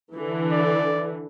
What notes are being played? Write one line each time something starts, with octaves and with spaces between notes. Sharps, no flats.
D3 E3
D5